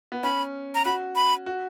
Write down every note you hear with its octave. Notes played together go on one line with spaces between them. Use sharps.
B3
C#4 B5
A#5
F#4 B5
B5
F#4